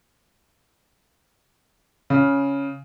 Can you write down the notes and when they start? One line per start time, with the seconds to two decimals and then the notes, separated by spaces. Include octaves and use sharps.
2.10 C#3